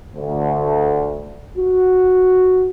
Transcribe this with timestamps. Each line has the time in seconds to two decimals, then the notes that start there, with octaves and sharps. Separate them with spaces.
0.15 D2
1.57 F#4